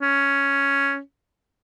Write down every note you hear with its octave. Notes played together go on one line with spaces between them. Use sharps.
C#4